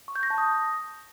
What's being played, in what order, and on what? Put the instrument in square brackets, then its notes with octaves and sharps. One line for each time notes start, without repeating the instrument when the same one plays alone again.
[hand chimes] C#6
G6
A#6
A5
D#6